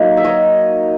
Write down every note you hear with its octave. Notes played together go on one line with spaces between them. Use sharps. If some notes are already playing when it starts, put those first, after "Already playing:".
Already playing: F#3 A#3 D#4
E5
C#5 D#5